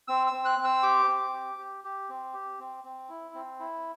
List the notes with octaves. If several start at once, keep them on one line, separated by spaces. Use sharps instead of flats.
C4 E6
E6
C4
F#6
C4
E6
G4 D6
C4
G4
G4
G4
C4
G4
C4
C4
E4
C4
E4